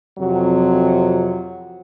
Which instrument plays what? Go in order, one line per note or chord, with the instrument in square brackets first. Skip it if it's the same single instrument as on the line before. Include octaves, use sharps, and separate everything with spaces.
[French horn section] F2 C3 F#3